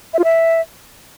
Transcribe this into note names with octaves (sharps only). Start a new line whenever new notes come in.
E5
F4
E5